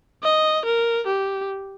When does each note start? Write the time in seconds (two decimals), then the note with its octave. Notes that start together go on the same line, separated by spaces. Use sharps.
0.23 D#5
0.65 A#4
1.07 G4